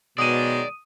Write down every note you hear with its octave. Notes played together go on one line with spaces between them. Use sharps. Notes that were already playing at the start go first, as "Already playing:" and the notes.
B2 D#3 F#3 G#3 D5 D#6 D#7